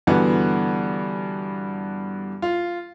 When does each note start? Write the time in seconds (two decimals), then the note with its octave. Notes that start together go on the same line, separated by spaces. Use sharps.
0.07 G2 D3 E3 B3 F#4
2.42 F4